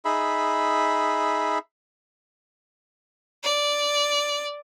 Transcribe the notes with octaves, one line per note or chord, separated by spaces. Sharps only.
D#4 G#4 E5 B5
D5